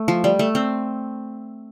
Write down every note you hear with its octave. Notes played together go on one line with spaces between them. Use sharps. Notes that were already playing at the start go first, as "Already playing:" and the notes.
Already playing: A3
F3
G3
A3
C4